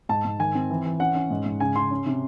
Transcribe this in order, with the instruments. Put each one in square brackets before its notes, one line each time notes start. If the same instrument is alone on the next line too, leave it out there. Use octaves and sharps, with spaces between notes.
[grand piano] G#2 A5
G#2
D#3 G#5
C4
E3
E3
C#4 F#5
C#4
G#2
G#2
C#3 G#5
C#3 C6
C#4
C3